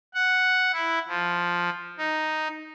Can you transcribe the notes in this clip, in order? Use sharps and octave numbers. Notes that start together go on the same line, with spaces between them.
F#5
E4
F3
D#4